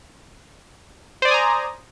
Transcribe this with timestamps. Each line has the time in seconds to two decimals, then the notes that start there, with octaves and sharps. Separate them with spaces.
1.22 C5
1.25 D5
1.28 D#6
1.31 G#5
1.34 A#5